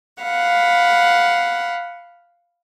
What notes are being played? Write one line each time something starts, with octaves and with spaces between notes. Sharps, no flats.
F5 F#5 B5